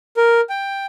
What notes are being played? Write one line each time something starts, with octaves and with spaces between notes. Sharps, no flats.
A#4
G5